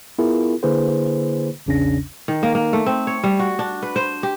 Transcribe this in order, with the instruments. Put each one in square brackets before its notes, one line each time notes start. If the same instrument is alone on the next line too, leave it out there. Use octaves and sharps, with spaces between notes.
[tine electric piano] B3 E4 F4 G#4 A#4
D3 A#3 E4 G#4 B4 C5
A#1 E2 C#3 C#4 D4 A#6
[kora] D#3
A#3
A#3
A3
C4
C#5
G3
F#4
D4
B4
C5
G4